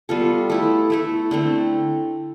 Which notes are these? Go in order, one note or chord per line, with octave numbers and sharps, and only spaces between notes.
G3 B3 F4 A4
A3 E4 A4
A3 E4 A4
D3 A3 C4